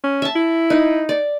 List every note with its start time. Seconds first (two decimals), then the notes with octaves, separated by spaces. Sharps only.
0.04 C#4
0.22 E5 A5
0.36 E4
0.70 D#4
1.09 D5